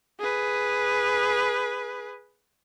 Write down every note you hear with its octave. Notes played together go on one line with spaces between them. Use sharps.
G#4 B4